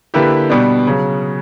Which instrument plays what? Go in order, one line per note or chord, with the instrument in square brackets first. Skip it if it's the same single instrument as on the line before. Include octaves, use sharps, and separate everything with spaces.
[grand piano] D3 A#3 E4 G4 B4
B2 G3 B3 D4
C#3 F#3